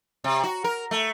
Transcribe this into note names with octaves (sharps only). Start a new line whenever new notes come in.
C3
F#4
A#4
A3